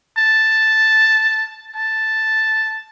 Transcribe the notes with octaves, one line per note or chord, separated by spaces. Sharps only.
A5
A5